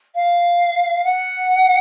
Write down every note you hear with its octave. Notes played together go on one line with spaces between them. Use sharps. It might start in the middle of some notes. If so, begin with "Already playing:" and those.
F5
F#5